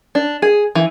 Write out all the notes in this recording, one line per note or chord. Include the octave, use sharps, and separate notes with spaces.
D4
G#4
E3